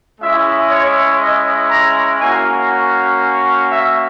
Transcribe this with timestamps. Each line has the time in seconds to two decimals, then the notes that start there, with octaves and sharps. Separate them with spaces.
0.20 G#3 C#4 E4 E5
0.69 C#5
1.20 D#5
1.70 A#5
2.20 A#3 C#4 F#4 G#5
3.70 E5